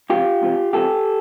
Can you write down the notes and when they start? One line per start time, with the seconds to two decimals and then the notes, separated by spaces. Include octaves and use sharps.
0.10 C#2 C3 F3 F4 G4
0.42 C#2 C3 F3
0.73 C#2 C3 F3 G4 A4